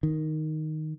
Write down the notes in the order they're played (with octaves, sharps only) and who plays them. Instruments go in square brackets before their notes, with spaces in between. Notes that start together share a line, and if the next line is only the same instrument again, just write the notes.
[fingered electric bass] D#3